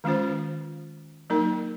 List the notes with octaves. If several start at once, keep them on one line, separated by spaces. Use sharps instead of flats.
D#3 G#3 C#4 F4 C5
F#3 A#3 D#4 A#4